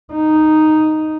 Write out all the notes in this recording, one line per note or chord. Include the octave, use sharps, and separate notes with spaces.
D#4